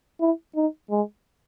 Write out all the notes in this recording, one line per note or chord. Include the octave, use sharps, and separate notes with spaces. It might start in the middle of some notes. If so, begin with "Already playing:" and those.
E4
D#4
G#3